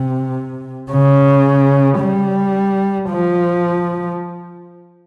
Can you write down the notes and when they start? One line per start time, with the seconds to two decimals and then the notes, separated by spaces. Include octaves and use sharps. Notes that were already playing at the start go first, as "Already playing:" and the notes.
Already playing: C3
0.91 C#3
2.00 G3
3.10 F3